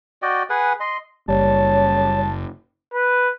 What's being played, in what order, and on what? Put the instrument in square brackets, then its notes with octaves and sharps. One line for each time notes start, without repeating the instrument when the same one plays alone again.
[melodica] F#4 D5 D#5 G5
G#4 B4 F#5 G#5
D#5 C6
[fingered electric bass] F#1 [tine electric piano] G3 [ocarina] C#5 [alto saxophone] A5
[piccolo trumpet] B4